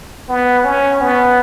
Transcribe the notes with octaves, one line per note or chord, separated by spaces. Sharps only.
B3
C#4
B3